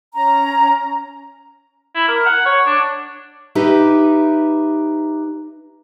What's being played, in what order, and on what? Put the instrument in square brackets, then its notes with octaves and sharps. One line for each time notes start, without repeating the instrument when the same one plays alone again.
[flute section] C#4 A#5
[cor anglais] E4
A#4
F#5
C#5
D4
[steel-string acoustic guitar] D#4 G4 B4 E5